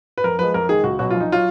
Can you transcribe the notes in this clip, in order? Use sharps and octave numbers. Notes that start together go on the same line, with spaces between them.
B4
F2 A#4
F3 G#3 B4
F2 A#4
D#3 G#3 G#4
C#2 F#4
B2 F#3 F#4
A#1 F4
D#4
F#3 F4